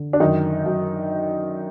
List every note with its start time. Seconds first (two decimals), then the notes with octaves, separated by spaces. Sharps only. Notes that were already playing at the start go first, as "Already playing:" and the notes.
Already playing: D3
0.13 D4
0.20 F#2 D#3 D#4
0.66 F#2